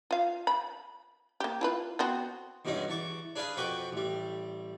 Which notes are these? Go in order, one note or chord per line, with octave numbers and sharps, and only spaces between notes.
F4 F5
B5
A#3 G4
E4 F4 B4
B3 C4 F#4
E2 G2 B2 G#3 C#4 D#4
E2 A5 C#6 D6
D4 G#4 B4 F5 B5
F2 B2 B4 G5 C#6 D6
A1 G3